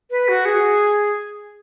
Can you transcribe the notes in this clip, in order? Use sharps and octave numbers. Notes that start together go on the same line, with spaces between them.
B4
F#4
G#4